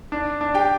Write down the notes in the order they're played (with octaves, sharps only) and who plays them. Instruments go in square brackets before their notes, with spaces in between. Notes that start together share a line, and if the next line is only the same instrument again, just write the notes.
[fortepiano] D4
D4
[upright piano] G4 G5